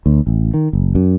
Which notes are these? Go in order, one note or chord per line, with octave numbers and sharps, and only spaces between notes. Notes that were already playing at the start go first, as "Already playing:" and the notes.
D2
A1
D#3
F#1
F#2